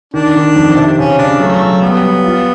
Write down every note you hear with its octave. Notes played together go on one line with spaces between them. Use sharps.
D#3 D4
D#3
F2
C3
C#3 C#4
C#3 D4
F#3 A3
F#3
G3 B3
G3
F4